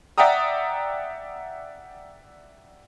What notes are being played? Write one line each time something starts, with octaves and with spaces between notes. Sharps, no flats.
D5 E5 F#5 G5 A#5 D#6